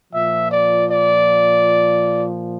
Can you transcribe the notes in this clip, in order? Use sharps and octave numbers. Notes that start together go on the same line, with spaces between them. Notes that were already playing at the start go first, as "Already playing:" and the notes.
A#2 F3 E5
D5
D5